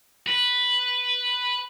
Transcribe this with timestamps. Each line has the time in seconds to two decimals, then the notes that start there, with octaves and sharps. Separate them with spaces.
0.27 B4